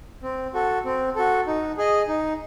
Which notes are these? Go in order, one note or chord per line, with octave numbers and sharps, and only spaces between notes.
C4
F#4 A4
C4
F#4 A4
D#4
G#4 D#5
D#4